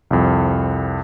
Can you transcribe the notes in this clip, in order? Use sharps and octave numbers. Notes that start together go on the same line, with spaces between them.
C2 F2